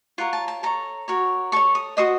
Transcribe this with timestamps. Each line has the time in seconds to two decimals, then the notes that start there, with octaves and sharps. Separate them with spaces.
0.18 F4 A#4 C#5 F#5
0.33 A5
0.48 A5
0.63 A4 C#5 A#5
1.08 F#4 A#4 C#5
1.52 A4 C#5 C#6
1.75 D#6
1.97 F#4 C5 D#5 D#6